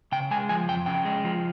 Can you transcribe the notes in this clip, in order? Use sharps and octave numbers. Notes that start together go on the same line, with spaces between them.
C#3 G5
G#3 G#5
F3 G#5
F2 G5
C#3 G5
G#3
F3